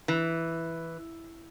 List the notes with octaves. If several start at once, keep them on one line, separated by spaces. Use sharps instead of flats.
E3